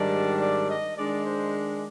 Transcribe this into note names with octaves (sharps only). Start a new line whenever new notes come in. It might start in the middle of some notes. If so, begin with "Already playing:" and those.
Already playing: G#2 D#3 G3 D4 D5
D5
D#5
D#3 G#3 D4 D5
C5